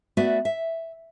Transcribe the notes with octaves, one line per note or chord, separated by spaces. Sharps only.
A3 B3 F#4 D5 E5
E5